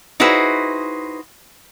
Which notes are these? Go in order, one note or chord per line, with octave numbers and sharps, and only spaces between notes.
D#4 E4 F#4 G#4 B4 C5